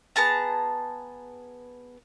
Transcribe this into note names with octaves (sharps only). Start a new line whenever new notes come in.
B3 G#4 A5 A#5